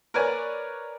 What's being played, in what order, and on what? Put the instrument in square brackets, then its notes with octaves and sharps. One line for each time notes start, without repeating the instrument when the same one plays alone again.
[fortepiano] A#4 B4 C#5 D5 G#5